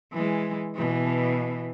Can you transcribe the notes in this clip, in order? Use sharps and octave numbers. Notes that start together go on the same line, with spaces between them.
E3 G#3
B2 E3